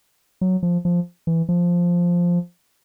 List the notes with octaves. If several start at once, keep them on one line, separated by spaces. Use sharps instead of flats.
F#3
F3
F3
E3
F3